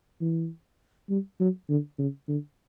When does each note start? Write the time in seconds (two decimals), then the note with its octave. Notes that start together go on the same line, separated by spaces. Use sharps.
0.21 E3
1.10 G3
1.40 F#3
1.69 D3
1.98 C#3
2.28 D3